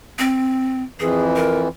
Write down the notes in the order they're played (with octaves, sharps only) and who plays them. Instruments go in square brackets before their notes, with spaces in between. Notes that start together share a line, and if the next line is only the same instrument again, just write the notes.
[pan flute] C4
[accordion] F2 E3 [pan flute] G#4
[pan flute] A#4